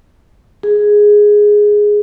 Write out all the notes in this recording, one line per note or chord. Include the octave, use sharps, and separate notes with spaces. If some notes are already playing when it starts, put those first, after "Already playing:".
G#4